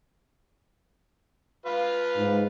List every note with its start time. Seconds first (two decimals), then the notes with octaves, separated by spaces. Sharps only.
1.66 F4 B4 F5
2.18 G#2